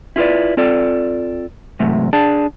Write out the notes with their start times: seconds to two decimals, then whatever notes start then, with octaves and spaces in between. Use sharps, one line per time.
0.16 E4 F4 G4 B4 D5
0.57 C4 F4 A4 D5
1.79 E2 G#2 C3 F#3 A3
2.13 D4 G#4 D5 A5